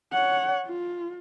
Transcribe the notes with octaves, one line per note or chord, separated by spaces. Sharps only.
C#5 F#5
F4